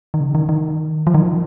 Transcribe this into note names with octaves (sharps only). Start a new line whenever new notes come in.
D#3
C#3
D#3
D#3
F3
D#3
F3